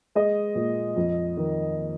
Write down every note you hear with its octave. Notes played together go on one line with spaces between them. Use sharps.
G#3 D#5
A#2
F2
D#3